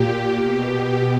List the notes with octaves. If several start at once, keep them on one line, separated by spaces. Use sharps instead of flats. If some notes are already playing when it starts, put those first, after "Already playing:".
Already playing: A#2 G4
B2 G4